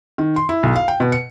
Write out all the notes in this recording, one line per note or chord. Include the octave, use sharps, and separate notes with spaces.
D#3
C6
E4
B1
F5
G5
B2
C#7